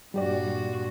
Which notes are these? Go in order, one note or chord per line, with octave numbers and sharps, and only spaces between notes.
G2 A#2 G3 F#4 G4 D5